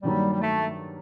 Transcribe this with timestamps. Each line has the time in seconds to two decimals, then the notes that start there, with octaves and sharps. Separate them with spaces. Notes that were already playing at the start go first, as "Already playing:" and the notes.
0.03 G2 D#3 F#3 G3 A#3
0.32 G3
0.41 A3